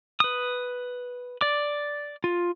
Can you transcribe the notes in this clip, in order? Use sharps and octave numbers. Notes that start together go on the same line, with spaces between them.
B4 D#6
D5 D6
F4